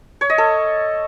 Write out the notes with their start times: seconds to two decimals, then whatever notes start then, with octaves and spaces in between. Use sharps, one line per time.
0.21 C#5
0.30 D#5
0.38 A4